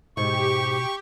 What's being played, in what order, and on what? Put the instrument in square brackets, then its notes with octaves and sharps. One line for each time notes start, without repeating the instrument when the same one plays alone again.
[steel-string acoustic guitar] G#2 [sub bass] B2 [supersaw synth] G4 [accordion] C#6